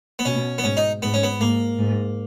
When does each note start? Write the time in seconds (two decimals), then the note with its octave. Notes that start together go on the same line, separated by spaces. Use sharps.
0.19 B3
0.25 B2 C#4
0.58 B3
0.64 G#2 C#4
0.77 D#4
1.02 G#2 B3
1.14 C#4
1.23 B3
1.40 G#2 A#3
1.79 G#2